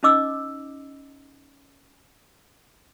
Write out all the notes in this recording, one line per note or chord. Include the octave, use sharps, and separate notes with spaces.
C#4 D#4 D#5 D6 E6